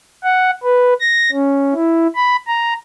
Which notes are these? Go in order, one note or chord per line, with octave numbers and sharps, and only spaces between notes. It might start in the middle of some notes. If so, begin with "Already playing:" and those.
F#5
B4
A#6
C#4
E4
B5
A#5